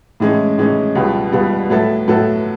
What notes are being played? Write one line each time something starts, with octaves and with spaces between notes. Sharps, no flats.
A2 E3 G#3 C#4
A2 E3 G#3 C#4
C#2 B2 G3 B3
C#2 B2 G3 B3
A2 F#3 B3 E4 A4
A2 F#3 B3 E4 A4